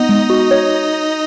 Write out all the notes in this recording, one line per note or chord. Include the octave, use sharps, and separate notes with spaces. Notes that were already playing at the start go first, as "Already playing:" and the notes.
Already playing: B3 D#4 D#5
G#3
F#4
C#5